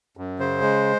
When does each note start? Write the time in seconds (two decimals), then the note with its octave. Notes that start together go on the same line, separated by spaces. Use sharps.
0.17 F#2
0.39 C#3 C5
0.62 G#3